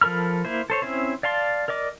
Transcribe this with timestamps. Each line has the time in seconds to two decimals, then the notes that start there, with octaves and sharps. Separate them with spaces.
0.01 F3 A4 A#4 B5 F6
0.45 A#3 E4 C5
0.70 A4 C5 C#5
0.82 C4 C#4 E4 C5
1.23 D5 F5 A5 C6
1.68 A#4 D5 D#5 D6